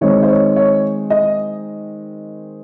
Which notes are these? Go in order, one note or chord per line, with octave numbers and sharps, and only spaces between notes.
D#3 G#3 C4 C#5
C5
C#5
C#5
D#5